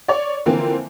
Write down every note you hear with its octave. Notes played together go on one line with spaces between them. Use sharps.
C#5 D5
D3 E3 F3 A#3 C4